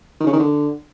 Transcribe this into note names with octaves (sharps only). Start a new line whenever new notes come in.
D#3
C#3
D#3
D3